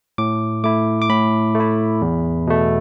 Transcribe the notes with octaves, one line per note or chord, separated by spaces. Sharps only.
A2 D6
A3 E4 D6
D6
A2 B5
A3
E4
E2
B2 A3